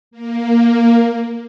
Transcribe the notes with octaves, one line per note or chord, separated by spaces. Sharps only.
A#3